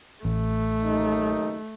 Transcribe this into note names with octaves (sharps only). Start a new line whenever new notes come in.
A1 A3
F#1 D#2 D#4